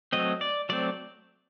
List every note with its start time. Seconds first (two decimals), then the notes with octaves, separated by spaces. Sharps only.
0.13 F#3 A3 C4 D#5
0.41 D5
0.69 F#3 A3 C4 D5